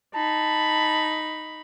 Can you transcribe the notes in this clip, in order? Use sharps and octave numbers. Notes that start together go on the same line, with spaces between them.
D#4 A5 B5